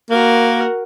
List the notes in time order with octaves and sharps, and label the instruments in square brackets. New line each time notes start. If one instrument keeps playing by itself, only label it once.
[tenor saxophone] A#3 [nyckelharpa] F#4 A#4